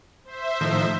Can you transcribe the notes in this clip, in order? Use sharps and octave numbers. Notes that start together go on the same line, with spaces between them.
C5 E5
A2 D#3 F3